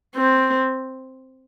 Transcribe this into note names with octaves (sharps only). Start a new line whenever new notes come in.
C4